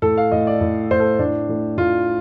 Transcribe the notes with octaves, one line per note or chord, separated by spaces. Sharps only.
A2 A4
F5
A2 D#5
D5
A2
A2 C5
A4
A2 D4
A2
A2 F4